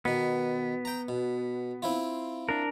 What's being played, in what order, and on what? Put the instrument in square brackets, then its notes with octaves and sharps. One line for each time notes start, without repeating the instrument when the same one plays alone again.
[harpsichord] B2 D#3 [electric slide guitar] B3
[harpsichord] G5 A#5
B2
C4 E4 F4
[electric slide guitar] D4 A#4